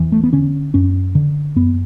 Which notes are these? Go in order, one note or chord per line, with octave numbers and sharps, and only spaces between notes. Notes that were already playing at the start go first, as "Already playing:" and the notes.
Already playing: E2 E3
A3
B3
D3 C#4
F#2 C#4
D3
F#2 B3